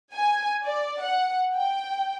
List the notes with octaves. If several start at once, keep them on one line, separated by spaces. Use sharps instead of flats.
G#5
D5
F#5
G5